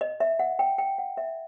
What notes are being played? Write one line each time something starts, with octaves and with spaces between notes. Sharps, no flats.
D#5
E5
F#5
G5
G5
F#5
E5